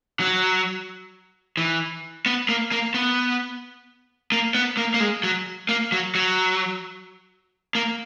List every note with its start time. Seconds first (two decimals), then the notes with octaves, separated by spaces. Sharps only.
0.20 F#3
1.57 E3
2.26 B3
2.49 A#3
2.72 A#3
2.94 B3
4.32 A#3
4.55 B3
4.77 A#3
4.94 A#3
5.00 G#3
5.23 F#3
5.69 A#3
5.92 F#3
6.15 F#3
7.75 A#3